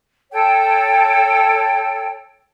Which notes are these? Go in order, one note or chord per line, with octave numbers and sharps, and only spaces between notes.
A4 C#5 G5